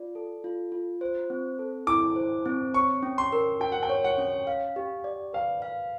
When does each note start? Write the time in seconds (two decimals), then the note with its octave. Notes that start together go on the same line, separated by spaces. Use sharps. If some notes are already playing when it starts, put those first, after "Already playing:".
Already playing: F4 D5
0.15 A4
0.44 F4
0.72 F4
1.01 C5
1.30 C4
1.59 A4
1.87 E4 D6
2.16 C5
2.46 C4
2.74 C#5 C#6
3.03 C#4
3.18 C6
3.32 A#4
3.60 F#4 G5
3.72 F#5
3.83 G5
3.90 C#5
4.04 F#5
4.18 C#4
4.47 F5
4.76 G4
5.04 D5
5.33 B4 F5
5.62 F5